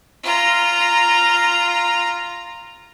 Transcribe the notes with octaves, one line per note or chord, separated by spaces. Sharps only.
F4 A#5